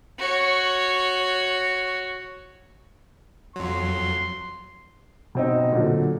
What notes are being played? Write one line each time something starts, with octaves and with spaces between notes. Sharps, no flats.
F#4 C#5
F2 F#3 C6
B2 C4 D#4
A#2 D3 F#3